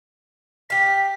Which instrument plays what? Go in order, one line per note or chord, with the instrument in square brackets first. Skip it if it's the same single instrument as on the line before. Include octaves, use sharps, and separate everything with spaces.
[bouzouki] G4 F5 [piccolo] B6